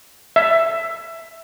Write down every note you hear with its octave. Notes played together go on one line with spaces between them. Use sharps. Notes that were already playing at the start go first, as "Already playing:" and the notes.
E5